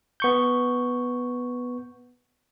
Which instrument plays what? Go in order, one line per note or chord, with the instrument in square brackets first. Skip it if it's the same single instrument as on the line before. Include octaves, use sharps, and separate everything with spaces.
[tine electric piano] B3 C#6 G6